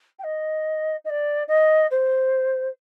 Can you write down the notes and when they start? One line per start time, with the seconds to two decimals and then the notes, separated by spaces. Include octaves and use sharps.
0.19 G5
0.24 D#5
1.05 D#5
1.10 D5
1.48 D#5
1.91 C5